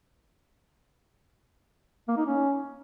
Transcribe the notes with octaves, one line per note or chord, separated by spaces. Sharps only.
A#3
D#4
C#4